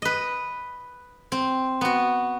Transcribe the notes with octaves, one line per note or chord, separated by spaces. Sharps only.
B4 D#5
C4
B3 F#4